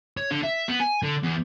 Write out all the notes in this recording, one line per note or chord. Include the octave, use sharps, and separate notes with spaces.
C#5
D3
E5
B3
G#5
D3
E2